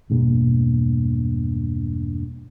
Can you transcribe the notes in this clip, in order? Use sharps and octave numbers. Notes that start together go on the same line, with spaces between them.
E1 G2 B2 A#3